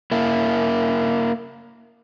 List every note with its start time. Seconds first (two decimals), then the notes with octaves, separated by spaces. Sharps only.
0.12 A#3 E4